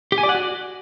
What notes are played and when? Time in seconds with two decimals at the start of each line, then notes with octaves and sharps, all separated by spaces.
0.12 G4
0.18 G#5
0.23 D5
0.29 F#5
0.35 F#4